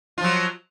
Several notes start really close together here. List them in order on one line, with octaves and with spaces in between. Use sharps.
F4 F3 F#3